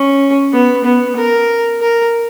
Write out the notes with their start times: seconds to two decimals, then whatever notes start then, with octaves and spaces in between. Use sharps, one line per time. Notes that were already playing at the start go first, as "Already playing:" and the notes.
Already playing: C#4
0.52 B3
0.84 B3
1.16 A#4
1.81 A#4